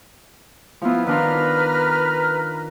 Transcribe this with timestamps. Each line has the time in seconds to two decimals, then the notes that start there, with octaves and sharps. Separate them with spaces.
0.82 F3 B3 E4 F4
1.07 D#3 D4 F4 B4 A#5 F6